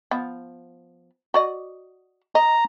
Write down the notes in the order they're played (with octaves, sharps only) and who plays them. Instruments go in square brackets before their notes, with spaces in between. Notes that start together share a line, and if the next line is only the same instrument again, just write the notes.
[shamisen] F3 B3
F#4 D5 D#5
[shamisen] D#5 [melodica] A#5